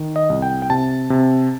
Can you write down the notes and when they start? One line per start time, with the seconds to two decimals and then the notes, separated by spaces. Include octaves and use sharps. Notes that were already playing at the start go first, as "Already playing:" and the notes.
Already playing: D#3
0.16 D#5
0.30 C2
0.42 G5
0.62 G5
0.70 C3 A5
1.10 C3